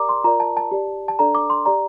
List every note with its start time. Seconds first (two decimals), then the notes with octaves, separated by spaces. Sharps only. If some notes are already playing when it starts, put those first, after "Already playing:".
Already playing: G4 A#4 D5 A#5 D6
0.09 C6
0.24 F4 A#4 D5 A#5
0.40 A5
0.57 A5
0.71 G4 D5
1.08 A5
1.19 D4 A4 D5 A#5
1.35 D6
1.50 C6
1.66 G4 D5 A#5